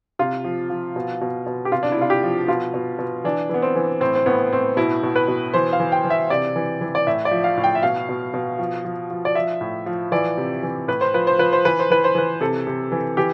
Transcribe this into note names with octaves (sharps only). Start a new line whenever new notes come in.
C3 F4
F3
F3
B2
B2
B2
G4
C3 F4
D4
E4
C3 F4
G4
F3
B2 F4
B2
B2
E3 D4
E3 B3
C4
E3
A2 C4
C4
A2 B3
A2 C4
B2 E4
B2
B4
B2
E3 C5
F5
E3
G5
E3
E5
C3 D5
E3
E3
D5
A2 E5
D5
F3
F5
A2
G5
E5
B2 F5
B2
B2
F3
F3
F3
D5
F3 E5
A2
F3
E3 D5
C3
E3
A2 B4
C5
F3 B4
C5
F3 B4
C5
E3 B4
C5
E3 B4
C5
E3 B4
C3 A4
C3
E3
E3 G4